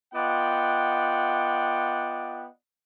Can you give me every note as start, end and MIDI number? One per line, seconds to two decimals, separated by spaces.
0.14 2.46 59
0.14 2.46 65
0.14 2.46 74
0.14 2.46 75
0.14 2.46 78
0.14 2.46 79